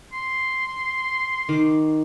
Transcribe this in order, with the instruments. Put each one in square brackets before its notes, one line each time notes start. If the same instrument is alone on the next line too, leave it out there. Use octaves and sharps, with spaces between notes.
[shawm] C6
[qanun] D#3 D6